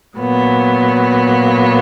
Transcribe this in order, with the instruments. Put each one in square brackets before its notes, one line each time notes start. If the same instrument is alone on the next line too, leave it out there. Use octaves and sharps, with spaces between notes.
[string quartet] A#2 F#3 B3